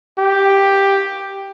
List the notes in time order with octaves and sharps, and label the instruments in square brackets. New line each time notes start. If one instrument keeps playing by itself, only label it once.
[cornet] G4